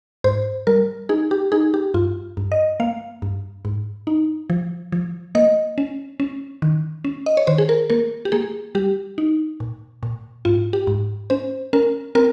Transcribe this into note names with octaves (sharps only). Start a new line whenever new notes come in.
G#2 C5
G3 A#4
D#4 G#4
G4
D#4 G#4
G4
G2 F4
G2
D#5
A#3 F5
G2
G#2
D#4
F3
F3
A#3 D#5
C#4
C#4
D#3
C#4
D#5
C#5
D#3 C5
G#4
A#4
A#3 A#4
G4
A#3 G#4
G3 G4
D#4
A#2
A#2
G#2 F4
G4
G#2
C#4 C5
C#4 A#4
C4 A#4